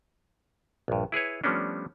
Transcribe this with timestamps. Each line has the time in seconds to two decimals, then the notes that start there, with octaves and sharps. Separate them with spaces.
0.88 A#1 G2
1.12 E4 G#4 B4 C#5
1.44 F3 G3 A3 B3 C#4 D4